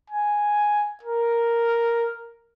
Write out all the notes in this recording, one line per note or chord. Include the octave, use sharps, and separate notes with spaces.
G#5
A#4